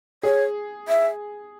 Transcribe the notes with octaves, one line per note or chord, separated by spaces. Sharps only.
G#4 C#5
E5